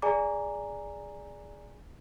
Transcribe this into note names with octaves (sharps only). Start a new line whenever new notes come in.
G#4 D5 G#5 A#5 D6